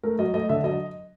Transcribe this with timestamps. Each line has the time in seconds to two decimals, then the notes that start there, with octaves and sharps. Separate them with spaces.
0.03 A3 A#4
0.19 F#3 D#5
0.34 A3 D#5
0.49 D3 E5
0.64 F#3 D#5